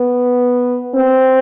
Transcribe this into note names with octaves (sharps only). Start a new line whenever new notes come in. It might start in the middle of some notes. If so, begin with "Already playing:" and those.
Already playing: B3
C4